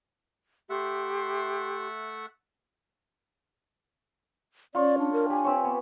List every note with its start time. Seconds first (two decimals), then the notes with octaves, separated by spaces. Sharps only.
0.70 A3 G4 E5 F#5 C6
4.75 C#4 F4 C#5 D5
4.98 D4
5.13 A#4
5.30 G4 G#5
5.44 C4 B4 C#5
5.64 B3